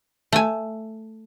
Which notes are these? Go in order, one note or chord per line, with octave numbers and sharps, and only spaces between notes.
A3 G#5